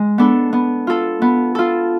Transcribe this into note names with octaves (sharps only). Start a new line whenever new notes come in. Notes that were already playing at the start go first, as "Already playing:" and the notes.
Already playing: G#3
B3 D4 A4
B3
F4 A4
B3
F4 A4